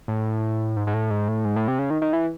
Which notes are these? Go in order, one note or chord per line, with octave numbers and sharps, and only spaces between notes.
A2
G#2
G#2
A2
G#2
A2
G#2
A2
C3
C#3
D#3
D#3
E3